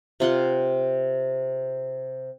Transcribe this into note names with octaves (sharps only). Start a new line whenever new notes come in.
C3 F4 F#5 C6